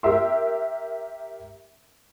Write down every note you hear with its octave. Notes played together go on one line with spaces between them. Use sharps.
G4 A#4 E5 C6